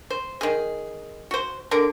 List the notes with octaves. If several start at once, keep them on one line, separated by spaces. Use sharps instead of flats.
C5
D#3 G#4
F#4 C5
D3 A#4 D5